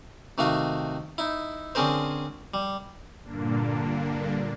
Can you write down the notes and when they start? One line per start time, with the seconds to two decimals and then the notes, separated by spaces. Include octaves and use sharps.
0.38 C3 D#3 A3 F#4 F5
1.18 D#4 E4
1.75 D3 C4 C#4 G#4 A#4 C5
2.54 G3
3.24 G2 A#2 D3 A#3 D4